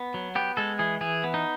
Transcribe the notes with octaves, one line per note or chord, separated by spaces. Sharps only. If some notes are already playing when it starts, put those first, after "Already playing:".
Already playing: B3
F#3
B3 G4
G#3 A4
E3 G#4
E3 G#4
B3
D#4